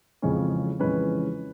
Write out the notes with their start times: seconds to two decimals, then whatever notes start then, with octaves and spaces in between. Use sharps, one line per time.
0.22 F2 C#3 E3 G#3 C#4
0.79 F2 C#3 E3 G#3 C#4 B4